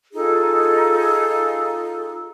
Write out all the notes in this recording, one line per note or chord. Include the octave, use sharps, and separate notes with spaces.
D#4 F4 G#4 A4